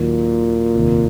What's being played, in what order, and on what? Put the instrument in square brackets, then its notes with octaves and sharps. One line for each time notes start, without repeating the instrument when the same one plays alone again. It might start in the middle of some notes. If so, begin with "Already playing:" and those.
Already playing: [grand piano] D#2 D#3 F#3 [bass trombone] A#2
[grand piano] F1 D#2 D#3